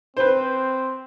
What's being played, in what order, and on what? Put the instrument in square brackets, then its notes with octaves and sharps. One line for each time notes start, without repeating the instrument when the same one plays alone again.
[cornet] C4 [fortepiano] B4 C5